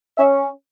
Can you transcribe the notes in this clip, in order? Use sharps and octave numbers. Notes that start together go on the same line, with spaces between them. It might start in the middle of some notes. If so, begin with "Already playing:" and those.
C#4 E5